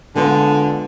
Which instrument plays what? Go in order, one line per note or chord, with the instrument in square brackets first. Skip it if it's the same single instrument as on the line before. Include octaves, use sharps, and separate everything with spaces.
[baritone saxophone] D3 [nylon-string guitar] G#3 B3 F4